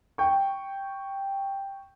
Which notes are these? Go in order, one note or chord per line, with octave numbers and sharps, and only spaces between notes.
G5 C#6